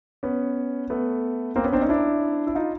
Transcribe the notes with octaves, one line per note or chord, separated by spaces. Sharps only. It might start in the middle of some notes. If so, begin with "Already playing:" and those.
B3 C#4
A3 B3
A#3 C4
B3 C#4
C4 D4
C#4 D#4
D4 E4
E4
D#4 F4